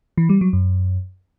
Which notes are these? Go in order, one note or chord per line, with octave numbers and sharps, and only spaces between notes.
E3
G3
F#3
F#2